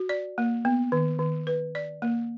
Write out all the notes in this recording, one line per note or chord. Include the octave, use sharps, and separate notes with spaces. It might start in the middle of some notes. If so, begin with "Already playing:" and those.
Already playing: F#4
D5
A#3
B3
D#3
D#3
B4
D5
A#3